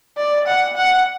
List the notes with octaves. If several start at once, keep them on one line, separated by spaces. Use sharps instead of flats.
D5
F#5
F#5